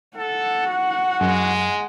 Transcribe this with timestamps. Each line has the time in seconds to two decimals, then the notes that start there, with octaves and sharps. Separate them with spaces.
0.17 A4 F#5
0.67 F#4
1.21 F#2 G#3